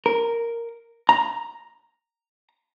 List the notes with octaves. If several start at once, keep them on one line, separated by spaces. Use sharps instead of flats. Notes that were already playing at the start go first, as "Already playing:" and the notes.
A#4
A#5